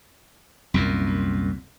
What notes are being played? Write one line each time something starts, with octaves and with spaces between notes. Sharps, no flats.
C2 F#2 A#2